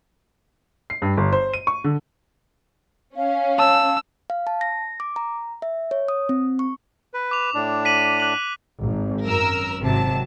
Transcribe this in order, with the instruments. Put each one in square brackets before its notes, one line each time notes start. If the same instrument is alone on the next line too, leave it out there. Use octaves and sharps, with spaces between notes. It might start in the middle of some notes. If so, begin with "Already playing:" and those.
[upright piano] C7
G2
G1
C5
D#7
C#6
D3
[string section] C#4 [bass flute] F5
[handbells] A5 [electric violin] E6
[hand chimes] F5
A5
A#6
D6
A#5
E5
C#5
D#6
C4
C#6
[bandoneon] B4
[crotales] D6 F7
[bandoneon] A2 D4
[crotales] B6 D#7 F#7
F#6 F#7
[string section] G#1
F#2 A#4 E6
G#1 C3 F#3 A5